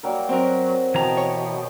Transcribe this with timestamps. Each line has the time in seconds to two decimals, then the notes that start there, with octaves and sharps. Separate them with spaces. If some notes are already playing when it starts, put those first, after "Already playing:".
0.03 F#3 G3 A#3 A#4
0.29 F#3 C4 F#4 A#4
0.95 B2 E3 G4 D#5 A5 A#5
1.17 C#5